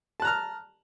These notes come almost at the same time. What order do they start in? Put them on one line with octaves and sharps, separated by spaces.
A5 F#6 A#5 F6